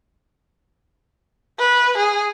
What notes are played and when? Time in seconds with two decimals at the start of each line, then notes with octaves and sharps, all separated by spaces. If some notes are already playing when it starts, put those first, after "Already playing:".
1.59 B4
1.98 G#4